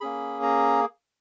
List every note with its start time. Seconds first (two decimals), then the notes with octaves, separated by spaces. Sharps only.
0.01 A#3 C#4 G#4 B5
0.43 A#5